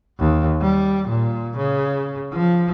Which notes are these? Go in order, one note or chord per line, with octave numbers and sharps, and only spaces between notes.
D#2
G3
A#2
C#3
F3